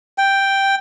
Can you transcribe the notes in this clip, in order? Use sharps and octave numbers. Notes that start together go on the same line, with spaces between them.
G5